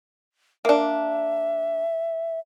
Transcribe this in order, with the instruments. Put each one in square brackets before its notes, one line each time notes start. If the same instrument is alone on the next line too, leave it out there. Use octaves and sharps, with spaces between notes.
[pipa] A#3 D4 [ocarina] E5